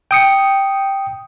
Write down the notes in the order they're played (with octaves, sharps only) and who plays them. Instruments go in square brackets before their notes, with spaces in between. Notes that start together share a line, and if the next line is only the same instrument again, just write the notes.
[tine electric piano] G5 D#6 C#7